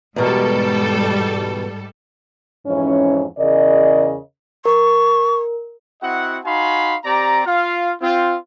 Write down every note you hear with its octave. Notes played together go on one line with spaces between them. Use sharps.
E2 G#2 B2 G3 A4 A#4
F2 G#2 E3 C#4
E2 C#3 A#4 D5 D#5
A#4 C#6
C4 E4 F#4 D#5 F#5
D#4 F#4 F5 G#5 B5 C6
C4 G4 D5 A#5
F4 F5
C4 F4